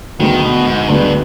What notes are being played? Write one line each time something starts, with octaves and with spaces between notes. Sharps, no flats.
D2 D3 D#3 G#3 B3
B2
G#2
D2 G2 D3 G#3 B3